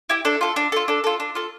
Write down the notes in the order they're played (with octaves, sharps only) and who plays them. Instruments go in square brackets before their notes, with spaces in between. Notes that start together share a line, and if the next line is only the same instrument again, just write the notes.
[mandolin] E4 G4
D4 A4
F4 A4
D4
F4 A4
D4 A4
F4 A4
D4
F4 A4